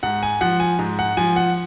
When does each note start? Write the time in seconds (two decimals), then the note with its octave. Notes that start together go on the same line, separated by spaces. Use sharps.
0.03 G#2 F#5
0.23 G#5
0.41 F3 F#5
0.60 G#5
0.79 G#2
0.99 F#5
1.17 F3 G#5
1.36 F#5